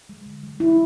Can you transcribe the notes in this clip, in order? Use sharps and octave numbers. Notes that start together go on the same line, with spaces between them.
G#3
D3
G#3
G#3 E4